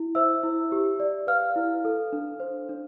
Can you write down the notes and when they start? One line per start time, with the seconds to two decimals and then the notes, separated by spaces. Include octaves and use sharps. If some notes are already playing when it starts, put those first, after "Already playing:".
Already playing: E4
0.15 C5 E5 E6
0.43 E4
0.72 G4
1.00 D5
1.27 B4 F5 F6
1.56 E4
1.85 A4
2.13 D4
2.40 C5
2.69 D4